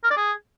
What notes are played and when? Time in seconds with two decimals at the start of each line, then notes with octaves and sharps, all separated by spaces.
0.04 A#4
0.10 D5
0.17 G#4